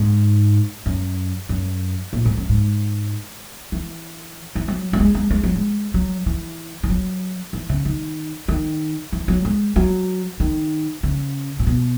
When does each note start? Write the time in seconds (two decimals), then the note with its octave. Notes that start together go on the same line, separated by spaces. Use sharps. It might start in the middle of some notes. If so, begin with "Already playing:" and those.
Already playing: G#2
0.86 F#2
1.49 F#2
2.13 A#2
2.25 G#2
2.37 F#2
2.49 G#2
3.72 E3
4.55 E3
4.68 F#3
4.93 F#3
5.00 G#3
5.15 G#3
5.30 G#3
5.43 F#3
5.55 G#3
5.94 F#3
6.26 E3
6.83 E3
6.90 F#3
7.53 E3
7.69 C#3
7.85 D#3
8.48 D#3
9.12 E3
9.28 F#3
9.45 G#3
9.76 F#3
10.40 D#3
11.03 C#3
11.59 A#2
11.67 B2